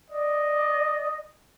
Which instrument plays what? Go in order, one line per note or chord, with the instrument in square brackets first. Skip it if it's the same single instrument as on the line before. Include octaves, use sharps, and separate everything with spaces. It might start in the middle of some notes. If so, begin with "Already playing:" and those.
[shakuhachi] D5 [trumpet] D#5